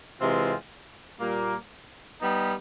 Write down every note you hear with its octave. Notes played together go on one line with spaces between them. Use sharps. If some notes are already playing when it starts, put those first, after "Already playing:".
C3 E3 G#3 C4 F4
A#2 G3 A#3
G3 B3 D#4